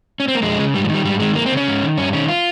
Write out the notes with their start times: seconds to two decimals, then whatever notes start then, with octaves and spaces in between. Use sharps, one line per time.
0.20 C#4
0.28 C4
0.35 A#3
0.43 F2 G#3
0.58 C#3
0.74 G#2 G3
0.84 F3
0.89 D#3
0.94 G3
1.05 G#2 G3
1.20 D#3 G#3
1.35 F2 A#3
1.46 C4
1.52 C#3
1.57 C#4
1.67 G#2
1.82 D#3
1.97 G2 C#4
2.13 D#3 C#4
2.28 F4